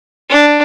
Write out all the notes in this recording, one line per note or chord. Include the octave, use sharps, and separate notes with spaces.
D4